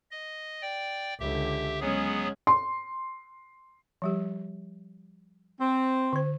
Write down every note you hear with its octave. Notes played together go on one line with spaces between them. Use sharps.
D#5
D5 G5
C#2 D3 G4 E5
F#3 G#3 B3 C#4 G#4
C6
F3 G3 G4
C4
D3 C5